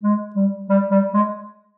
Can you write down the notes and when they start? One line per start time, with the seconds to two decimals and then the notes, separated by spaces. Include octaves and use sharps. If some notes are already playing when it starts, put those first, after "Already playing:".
0.03 G#3
0.36 G3
0.69 G3
0.91 G3
1.14 G#3